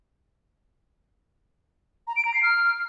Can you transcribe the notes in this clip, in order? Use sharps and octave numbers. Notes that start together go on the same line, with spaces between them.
A#5
D7
A#5
C7
F6